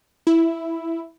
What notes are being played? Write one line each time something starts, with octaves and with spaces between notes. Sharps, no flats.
E4